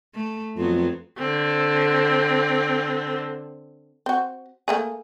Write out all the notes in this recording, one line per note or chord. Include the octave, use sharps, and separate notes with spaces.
A3
F2 F#3 B3 C4
D3 C4
C4 F#4
A3 A#3 G#4